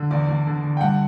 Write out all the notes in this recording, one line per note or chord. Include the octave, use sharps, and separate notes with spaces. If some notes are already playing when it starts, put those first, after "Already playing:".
Already playing: D3
E2 D5
E2
D3
D3
G5
G2 F#5